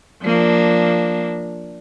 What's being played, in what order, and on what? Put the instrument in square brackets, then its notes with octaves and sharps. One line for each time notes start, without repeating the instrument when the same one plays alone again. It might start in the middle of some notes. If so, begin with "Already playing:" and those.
[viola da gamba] F3 A#3 D4